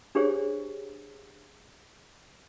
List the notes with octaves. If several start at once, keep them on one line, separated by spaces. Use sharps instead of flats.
D4 G4 G#4 C5 C#5